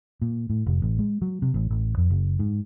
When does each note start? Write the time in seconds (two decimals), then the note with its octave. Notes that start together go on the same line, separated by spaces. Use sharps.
0.22 A#2
0.50 A2
0.66 F1
0.82 A1
0.99 G#3
1.22 F#3
1.42 C3
1.54 A1
1.70 A1
1.98 F2
2.10 F#1
2.39 G#2